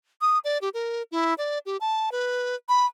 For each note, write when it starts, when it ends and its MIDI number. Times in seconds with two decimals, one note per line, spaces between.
0.21 0.38 87
0.44 0.58 74
0.61 0.69 67
0.74 1.03 70
1.11 1.34 64
1.38 1.59 74
1.66 1.77 67
1.81 2.10 81
2.12 2.55 71
2.69 2.86 83